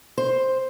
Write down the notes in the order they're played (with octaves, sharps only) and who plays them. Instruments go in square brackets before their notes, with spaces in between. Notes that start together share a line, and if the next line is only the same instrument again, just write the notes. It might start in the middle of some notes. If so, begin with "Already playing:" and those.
[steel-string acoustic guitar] C5